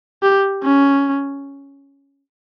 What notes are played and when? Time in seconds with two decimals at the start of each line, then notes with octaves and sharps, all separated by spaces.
0.23 G4
0.63 C#4